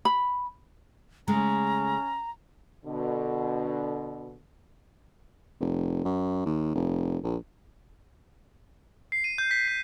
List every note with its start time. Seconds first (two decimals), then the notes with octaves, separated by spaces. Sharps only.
0.05 B5
1.28 C#3 G#3 A3 C#4 A#5
2.85 B2 D3
5.61 F1
6.05 F#2
6.46 D#2
6.75 F1
7.24 A#1
9.12 C7
9.24 D#7
9.38 G6
9.51 B6
9.68 C7